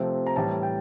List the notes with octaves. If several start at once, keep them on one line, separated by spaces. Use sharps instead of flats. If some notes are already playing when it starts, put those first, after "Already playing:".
Already playing: C3 F3 A3 C4
A#5
A2 E3 G3 A5
G5